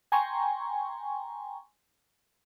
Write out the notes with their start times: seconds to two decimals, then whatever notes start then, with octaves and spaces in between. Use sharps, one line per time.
0.12 G5 G#5 A#5 C6 C#6